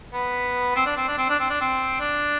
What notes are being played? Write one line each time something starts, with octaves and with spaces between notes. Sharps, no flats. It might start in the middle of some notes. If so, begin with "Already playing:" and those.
B3
C4
D4
C4
D4
C4
D4
C4
D4
C4
D4